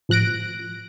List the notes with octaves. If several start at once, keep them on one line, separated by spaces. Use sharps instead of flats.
A2 F3 F#6 A#6 D7